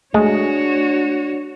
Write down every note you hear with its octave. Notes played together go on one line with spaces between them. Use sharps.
G#3 A3 D4 F#4 C#5